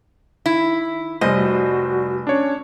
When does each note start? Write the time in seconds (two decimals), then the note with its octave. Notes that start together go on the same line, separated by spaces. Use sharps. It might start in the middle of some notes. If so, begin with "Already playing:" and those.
0.46 D#3 E4
1.21 F1 G3 C5 D#5
1.36 F#4
2.27 C#4 D4 C#5